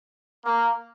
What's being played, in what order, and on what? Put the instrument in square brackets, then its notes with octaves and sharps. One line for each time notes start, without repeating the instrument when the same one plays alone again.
[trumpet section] A#3